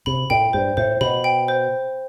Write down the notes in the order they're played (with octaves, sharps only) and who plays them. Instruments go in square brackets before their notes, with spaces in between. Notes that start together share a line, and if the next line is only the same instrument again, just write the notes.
[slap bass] C3 [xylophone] B5
[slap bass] A2 [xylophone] G5
[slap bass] G2 [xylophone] C5
[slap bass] A2 [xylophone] C5
[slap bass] B2 [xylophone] B5
[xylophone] G5
C5